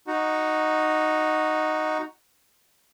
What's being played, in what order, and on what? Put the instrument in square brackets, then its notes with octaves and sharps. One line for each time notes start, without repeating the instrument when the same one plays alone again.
[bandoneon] D#4 F#4